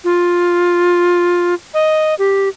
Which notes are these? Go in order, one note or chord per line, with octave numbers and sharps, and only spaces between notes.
F4
D#5
G4